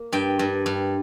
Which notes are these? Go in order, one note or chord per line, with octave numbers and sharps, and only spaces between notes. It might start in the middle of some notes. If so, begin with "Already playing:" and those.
Already playing: A#3
G2 G5
G2
G2